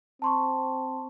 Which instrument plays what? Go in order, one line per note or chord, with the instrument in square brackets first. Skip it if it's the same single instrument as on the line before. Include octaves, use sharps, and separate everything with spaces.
[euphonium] C4 [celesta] A5 C6 C#6